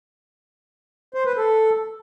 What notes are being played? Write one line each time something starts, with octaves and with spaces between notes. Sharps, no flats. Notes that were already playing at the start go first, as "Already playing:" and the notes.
C5
B4
A4